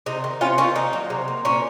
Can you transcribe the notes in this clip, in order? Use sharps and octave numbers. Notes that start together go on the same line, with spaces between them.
C3 D#4
D#3
C3 C#4 F4
D#3 C#4 F4
A#3 D#4
F#3
C3
A#3
A#2 C#4